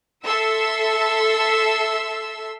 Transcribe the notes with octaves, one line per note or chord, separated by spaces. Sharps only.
A4 E5 C6 E6